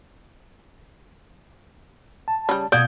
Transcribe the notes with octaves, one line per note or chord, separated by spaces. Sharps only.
A5
C#3 G3
B2 F4 F#4 D5 D#6 G6 G#6